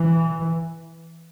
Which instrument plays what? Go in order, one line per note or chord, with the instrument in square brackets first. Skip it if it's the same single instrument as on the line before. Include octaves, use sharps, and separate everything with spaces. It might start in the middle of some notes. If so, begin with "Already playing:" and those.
Already playing: [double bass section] E3